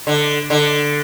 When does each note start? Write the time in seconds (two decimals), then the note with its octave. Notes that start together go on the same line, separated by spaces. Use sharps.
0.07 D3
0.50 D3